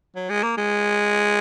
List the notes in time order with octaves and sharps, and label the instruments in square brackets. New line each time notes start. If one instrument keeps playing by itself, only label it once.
[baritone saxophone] F#3
G#3
A#3
G#3